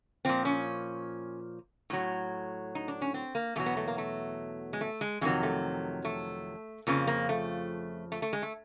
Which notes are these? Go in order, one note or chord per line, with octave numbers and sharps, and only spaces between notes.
A#2 F3 C4
C#4
A2 F#3
D#4
D4
C#4
C4
A#3
E2 B2 F#3 A3
B3
A3
A#3
A3
G#3
A3
G#3
F2 C3 D#3 F#3 G#3
A3
A3
F2 C#3 F3 A#3
A#3
A3
A3
A3
G#3
A3